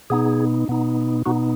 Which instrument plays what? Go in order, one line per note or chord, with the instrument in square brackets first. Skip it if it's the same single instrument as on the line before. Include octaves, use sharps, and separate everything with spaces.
[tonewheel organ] B2 B3 D#4 G#4
B2 B3 D#4
B2 B3 D#4 F#4